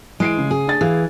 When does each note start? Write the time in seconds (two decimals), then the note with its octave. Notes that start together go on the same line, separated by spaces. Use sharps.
0.20 E3 G#3 C7 D7
0.38 C#3
0.51 G#4
0.67 D4 A6
0.81 E3 G#4 F5